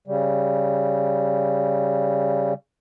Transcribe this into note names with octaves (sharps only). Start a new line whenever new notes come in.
C#3 G3